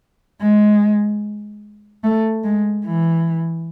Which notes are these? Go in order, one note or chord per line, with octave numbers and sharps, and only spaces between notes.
G#3
A3
G#3
E3